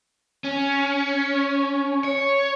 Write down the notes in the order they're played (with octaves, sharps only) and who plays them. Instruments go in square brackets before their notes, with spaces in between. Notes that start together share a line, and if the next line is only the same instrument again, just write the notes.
[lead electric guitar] C#4
C#5